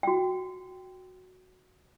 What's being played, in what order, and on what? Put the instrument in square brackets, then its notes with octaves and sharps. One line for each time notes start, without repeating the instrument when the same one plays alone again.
[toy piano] F#4 G5